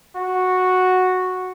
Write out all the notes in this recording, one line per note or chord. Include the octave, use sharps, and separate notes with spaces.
F#4